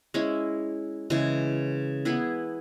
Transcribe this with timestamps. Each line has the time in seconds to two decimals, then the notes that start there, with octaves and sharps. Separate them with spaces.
0.14 G#3 C#4 E4
1.10 C#3 E3 G#3
2.05 B3 E4 G#4 B4